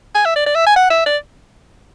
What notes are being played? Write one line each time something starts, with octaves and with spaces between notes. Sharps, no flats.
G#5
E5
D5
D5
E5
G#5
F#5
E5
D5